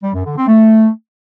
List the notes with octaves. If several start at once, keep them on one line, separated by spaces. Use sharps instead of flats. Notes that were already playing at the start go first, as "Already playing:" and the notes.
G3
F#2
D3
C4
A3